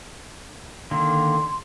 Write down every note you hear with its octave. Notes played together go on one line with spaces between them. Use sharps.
D3 D#3 A#3 C6